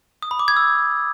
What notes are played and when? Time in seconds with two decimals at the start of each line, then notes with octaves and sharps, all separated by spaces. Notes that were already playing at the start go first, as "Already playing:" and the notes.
0.22 D#6
0.31 B5
0.39 D6
0.48 G#6
0.56 E6